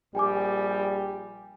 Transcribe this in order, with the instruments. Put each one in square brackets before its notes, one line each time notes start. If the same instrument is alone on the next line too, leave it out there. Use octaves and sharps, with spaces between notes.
[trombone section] A#1 G3 G4 [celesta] G5 G#5 D6